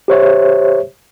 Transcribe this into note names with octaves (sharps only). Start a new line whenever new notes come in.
G4 C5 C#5 E5